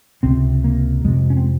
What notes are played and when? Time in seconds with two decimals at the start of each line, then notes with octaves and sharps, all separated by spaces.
0.23 C#2 C3 C4
0.64 A#3
1.04 F2 C3 G#3
1.30 C#4
1.37 C4